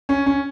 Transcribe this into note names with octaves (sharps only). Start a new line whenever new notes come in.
C#4
C#4